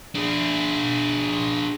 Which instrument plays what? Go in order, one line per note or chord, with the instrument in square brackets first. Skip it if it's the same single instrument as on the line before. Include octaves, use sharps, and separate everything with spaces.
[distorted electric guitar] D4 G#4